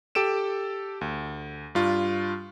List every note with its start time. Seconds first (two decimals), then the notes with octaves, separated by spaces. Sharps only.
0.15 G4 A4 D7 E7
1.01 D2
1.75 G2 F4